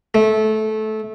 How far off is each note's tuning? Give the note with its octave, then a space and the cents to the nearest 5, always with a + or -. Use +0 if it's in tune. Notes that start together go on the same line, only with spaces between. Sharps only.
A3 -20